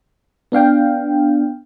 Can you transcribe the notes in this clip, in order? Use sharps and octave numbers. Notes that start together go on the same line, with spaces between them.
B3 D4 F5 G5